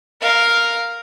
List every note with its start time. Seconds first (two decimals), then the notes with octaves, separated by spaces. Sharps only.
0.21 A#4 F5